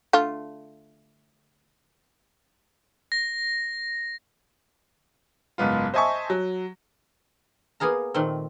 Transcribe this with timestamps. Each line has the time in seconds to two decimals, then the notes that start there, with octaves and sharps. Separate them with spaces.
0.13 D3 A3 F4
3.12 A#6
5.58 F#1 G#2 B3 F4
5.94 C5 D#5 E5 G#5 A5 C#6
6.30 F#3
7.80 A#3 B3 G#4 F5 A#5
8.14 A#2 D#3 A3 C4